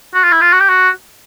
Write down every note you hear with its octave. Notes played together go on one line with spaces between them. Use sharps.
F#4
F4
E4
F4
F#4
G4
F#4